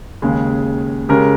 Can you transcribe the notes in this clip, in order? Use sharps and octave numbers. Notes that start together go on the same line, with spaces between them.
D#2 C#3 G#3
C#3 G#3 C#4 G4 A#4